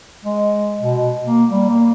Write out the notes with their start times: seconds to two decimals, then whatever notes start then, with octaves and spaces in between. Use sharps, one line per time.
0.25 G#3
0.81 B2
1.27 A#3
1.50 G3
1.69 A#3